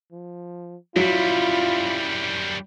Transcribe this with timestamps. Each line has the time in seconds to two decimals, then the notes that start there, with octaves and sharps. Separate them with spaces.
0.12 F3
0.96 F#2 F#3 G3 E4 F4